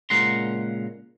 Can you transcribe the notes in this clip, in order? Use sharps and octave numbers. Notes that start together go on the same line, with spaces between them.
A#2 C#3 G#3 F#5 A#5 C6